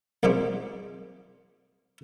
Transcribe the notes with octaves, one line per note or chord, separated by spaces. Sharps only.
B1 F#2 A#2 G#3 C4 G4